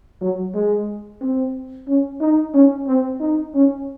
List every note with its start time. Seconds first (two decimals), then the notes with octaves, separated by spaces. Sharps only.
0.21 F#3
0.54 G#3
1.21 C4
1.88 C#4
2.20 D#4
2.54 C#4
2.87 C4
3.20 D#4
3.54 C#4